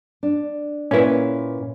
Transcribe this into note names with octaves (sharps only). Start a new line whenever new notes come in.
D4
A#2 C#4 E4 B4